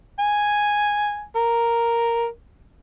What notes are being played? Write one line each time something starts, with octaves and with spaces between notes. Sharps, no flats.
G#5
A#4